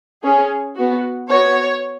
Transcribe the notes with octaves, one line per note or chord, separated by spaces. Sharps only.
C#4 G#4
B3 F#4
B3 F#4 C#5